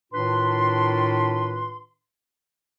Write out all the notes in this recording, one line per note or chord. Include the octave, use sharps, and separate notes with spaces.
A2 D#3 D4 F4 B4 C6